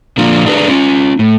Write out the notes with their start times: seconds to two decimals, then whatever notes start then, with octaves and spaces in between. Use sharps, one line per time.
0.17 A#2 D3 F3 A#3 D4 F4
0.46 D4 G#4 A#4 B4
0.68 C#4 F4
1.19 A2